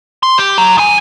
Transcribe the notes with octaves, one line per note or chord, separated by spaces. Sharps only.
C6
G4
F#3
D#3 G#5